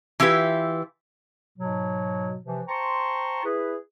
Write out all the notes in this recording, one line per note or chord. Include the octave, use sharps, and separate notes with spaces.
E3 E4 F4 G4 B4
G#2 B2 F#3
C3 E3 F3
C5 G5 A5 A#5 C6 C#6
E4 G#4 B4